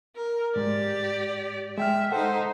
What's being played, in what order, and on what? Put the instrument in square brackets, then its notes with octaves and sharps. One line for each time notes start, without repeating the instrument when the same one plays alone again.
[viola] A#4
[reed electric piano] G#2 G#3 [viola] G4 D5
[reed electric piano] G#3 G5 F6 [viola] E5
[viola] D#4 C5 [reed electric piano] A4 F#5